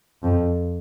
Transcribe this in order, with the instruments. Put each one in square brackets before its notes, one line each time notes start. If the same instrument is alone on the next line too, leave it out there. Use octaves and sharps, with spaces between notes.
[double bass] F2